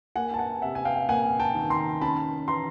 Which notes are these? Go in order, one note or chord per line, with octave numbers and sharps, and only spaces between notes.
A#3 F#5 G#5
A5
F#5 G#5
C3 E5 F#5
G#5
F5 G5
A#3 F#5 G#5
G5 A5
D#3
A#5 C6
C#4 A5 B5
E3 A#5 C6